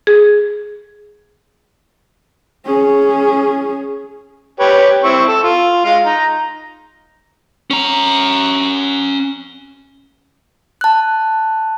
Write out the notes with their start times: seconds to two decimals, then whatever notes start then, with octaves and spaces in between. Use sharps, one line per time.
0.07 G#4
2.65 C#4 G#4
4.60 G4 B4 C#5
5.04 C4 E4 C#6
5.28 A4
5.43 F4
5.85 G#3 F4 F5
6.05 D#4 A#5
7.71 C#4 A#5
10.81 A5 F#6